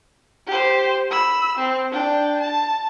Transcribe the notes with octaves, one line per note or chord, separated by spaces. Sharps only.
G4 C5
B5 E6
C4
D4 G5
A5